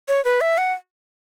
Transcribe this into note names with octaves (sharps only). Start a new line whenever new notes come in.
C#5
B4
E5
F#5